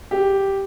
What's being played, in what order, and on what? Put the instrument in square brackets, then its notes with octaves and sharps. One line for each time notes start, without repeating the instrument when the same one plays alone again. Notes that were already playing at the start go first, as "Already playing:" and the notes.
[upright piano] G4